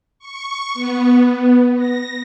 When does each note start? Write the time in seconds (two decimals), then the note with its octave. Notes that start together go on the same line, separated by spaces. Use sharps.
0.19 C#6
0.74 B3
1.76 A#6